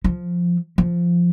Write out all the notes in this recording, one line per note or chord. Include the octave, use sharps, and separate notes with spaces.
F3
F3